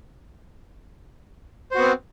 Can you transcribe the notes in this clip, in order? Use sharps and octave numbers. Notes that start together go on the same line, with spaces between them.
B3 C4 F#4 C5